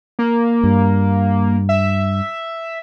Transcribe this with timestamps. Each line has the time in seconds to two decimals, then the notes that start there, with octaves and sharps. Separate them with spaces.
0.19 A#3
0.63 G2
1.69 E5